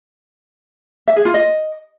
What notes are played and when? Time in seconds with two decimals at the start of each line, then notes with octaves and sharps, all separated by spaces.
1.08 E5
1.16 G#4
1.25 F4
1.34 D#5